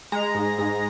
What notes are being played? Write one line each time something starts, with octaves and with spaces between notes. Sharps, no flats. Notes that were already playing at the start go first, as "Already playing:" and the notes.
G#3 A#5
G#2
G#2